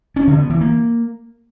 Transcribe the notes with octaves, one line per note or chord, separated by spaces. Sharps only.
C#4
D3
B3
E3
A#3